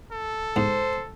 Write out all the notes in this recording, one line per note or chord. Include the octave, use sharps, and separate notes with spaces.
A4
G#2 C5